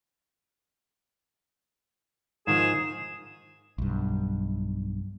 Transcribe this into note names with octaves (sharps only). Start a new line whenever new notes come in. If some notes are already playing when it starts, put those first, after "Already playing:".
G#2 D#3 F3 G#4 E7
B1 G2